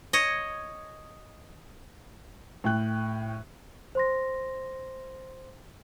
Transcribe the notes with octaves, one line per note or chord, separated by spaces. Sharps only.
C#5 D#5
A2 G5 F#6
C5 C6 A#6